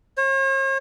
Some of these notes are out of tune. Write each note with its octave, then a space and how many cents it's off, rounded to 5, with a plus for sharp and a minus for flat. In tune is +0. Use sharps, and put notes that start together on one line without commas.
C#5 -45